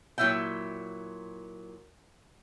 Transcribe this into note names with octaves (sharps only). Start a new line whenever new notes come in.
A#2 F#3 E4 E5 G5